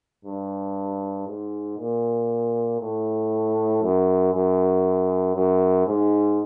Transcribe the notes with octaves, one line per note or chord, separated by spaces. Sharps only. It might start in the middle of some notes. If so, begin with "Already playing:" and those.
G2
G#2
A#2
A2
F#2
F#2
F#2
G#2